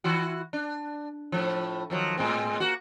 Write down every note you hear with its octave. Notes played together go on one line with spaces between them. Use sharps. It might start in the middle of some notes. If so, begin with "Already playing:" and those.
E3 E4 F#4
D4
A2 F3
D#3 F3 F#3
A2 G#3 C4
A#3 F#4